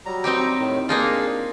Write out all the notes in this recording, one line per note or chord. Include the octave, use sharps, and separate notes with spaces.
F#3 G3 A#5
C4 D#4 G4
A2 D#3
A#3 D4 D#4 F4 G#4